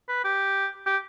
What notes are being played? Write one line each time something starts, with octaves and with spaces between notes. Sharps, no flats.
B4
G4
G4